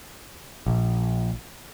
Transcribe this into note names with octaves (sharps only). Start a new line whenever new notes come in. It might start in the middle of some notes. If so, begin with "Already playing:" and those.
A#1